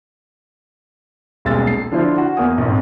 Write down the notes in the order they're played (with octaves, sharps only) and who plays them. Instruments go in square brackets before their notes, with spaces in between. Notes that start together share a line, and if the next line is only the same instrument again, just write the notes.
[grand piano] D#1 B1 G#3 E6 A6
C7
D3 F3 E4 F4 C5
F#4
E2 A#3 G#5 D#6
A#1 F2 G#2